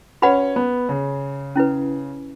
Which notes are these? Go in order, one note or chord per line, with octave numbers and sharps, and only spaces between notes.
C#4 F#4 B4 F#5 B5
B3
C#3
C#4 E4 B4